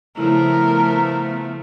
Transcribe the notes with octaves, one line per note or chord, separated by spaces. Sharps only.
C#3 F3 A3 B3 E4 A#4